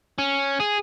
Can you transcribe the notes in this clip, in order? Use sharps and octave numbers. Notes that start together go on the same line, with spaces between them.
C#4
G#4